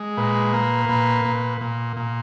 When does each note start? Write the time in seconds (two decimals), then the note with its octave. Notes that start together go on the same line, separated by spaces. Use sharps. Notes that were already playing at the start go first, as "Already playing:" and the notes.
Already playing: G#3
0.17 A#2 B4
0.53 A#3
0.89 A#2 B4
1.25 A#2
1.61 A#2
1.97 A#2